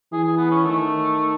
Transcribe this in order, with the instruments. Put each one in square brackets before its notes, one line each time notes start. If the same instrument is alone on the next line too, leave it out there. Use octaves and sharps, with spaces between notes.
[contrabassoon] E3 [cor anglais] G#4
[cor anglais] G#4
B3
C#4
[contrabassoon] D#3 [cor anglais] A3